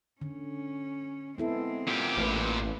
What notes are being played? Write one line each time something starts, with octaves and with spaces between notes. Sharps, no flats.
D3 C#4
G#3 B3 C4 E4 A4
A#2 G4
A1 A3 B4 C5